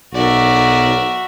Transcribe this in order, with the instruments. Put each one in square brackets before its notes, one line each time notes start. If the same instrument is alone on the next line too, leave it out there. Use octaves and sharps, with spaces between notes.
[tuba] B1 [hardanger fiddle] F#4 E5 [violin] A#4 D5